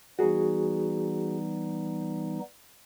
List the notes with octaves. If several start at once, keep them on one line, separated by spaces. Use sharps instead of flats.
E3 G3 B3 D#4 F#4 G#4